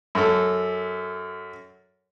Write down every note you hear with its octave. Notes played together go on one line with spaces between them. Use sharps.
F#2 A4